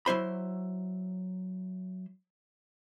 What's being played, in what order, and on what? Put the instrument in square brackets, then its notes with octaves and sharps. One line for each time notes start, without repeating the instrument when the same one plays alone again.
[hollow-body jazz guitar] F#3 E4 C5 B5